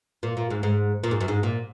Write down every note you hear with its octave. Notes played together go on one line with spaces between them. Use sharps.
A#2
A#2
G#2
G#2
A#2
G#2
F#2
G#2
A#2